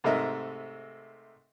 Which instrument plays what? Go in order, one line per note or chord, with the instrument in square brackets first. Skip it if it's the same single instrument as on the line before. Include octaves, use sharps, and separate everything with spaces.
[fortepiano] G#2 C3 A3 A#4 D#5 E5